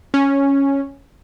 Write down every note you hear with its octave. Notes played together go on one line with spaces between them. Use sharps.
C#4